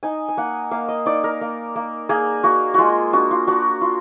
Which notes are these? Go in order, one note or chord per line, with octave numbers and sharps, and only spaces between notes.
D#4 G#5
G#5
A#3 F#5
A#3 F5
D#5
D#4 D5
A#4
A#3
A#3
A#3 G#4
A#3 F#4
G#3 F4 F#4
D4 F#4
F4
D4 F#4
F4